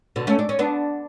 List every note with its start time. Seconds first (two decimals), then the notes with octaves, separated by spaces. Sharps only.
0.16 B2 D3
0.27 A3 C#4
0.39 D4
0.49 C#4
0.59 B3 D4